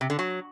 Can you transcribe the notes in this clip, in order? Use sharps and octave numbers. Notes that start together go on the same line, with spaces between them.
C3
D3
F#3